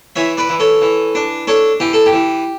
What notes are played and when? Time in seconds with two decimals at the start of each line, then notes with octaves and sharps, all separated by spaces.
0.16 E3 C#5 E5
0.37 B4 D5
0.49 E3
0.60 A4 C#5
0.81 E3
1.15 D4
1.47 D4 A4 C#5
1.80 E3 G4
1.93 A4
2.06 G4
2.13 E3